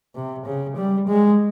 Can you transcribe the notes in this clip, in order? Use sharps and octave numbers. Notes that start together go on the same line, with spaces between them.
C3
C#3
G3
G#3